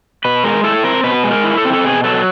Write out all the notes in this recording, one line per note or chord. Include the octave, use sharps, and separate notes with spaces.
B2 B4
G#3 A#4
E4 A4
C4 A#4
B2 B4
G#3
A#4
E4
A4
C4
A4
B2 G#4
F#3 A4